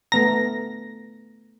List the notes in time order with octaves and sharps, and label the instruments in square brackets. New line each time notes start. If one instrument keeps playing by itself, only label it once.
[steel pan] A3 B3 A#5 [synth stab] A#6